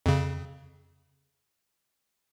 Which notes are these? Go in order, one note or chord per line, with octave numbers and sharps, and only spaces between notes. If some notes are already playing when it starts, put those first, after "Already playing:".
F2 C#3